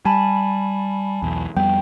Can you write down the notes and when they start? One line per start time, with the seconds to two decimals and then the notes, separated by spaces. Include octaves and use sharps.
0.05 G3 G#5 A5 B5
1.23 B1 E2
1.57 F2 G3 B3 G5